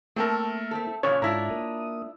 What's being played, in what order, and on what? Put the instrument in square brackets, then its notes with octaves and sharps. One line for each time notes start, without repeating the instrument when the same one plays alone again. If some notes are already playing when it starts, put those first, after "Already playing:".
[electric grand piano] A3 A4 A#4 [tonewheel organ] A#3 E4 [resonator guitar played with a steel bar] C4 A5
[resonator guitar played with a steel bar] A3 C4 A4
[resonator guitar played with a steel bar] A#2 C#3 E3 [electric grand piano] C#4 [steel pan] C#5
[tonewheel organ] G#2 A4 [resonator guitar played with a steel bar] D4 E4 F4 [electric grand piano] A#5 E6
[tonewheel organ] A#3 D#6